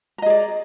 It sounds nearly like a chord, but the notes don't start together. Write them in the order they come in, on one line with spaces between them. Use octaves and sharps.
A#5 D#5 G#4 D5